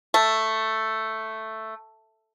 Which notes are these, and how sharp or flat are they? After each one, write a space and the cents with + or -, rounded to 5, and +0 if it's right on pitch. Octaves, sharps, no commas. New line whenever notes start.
A3 +5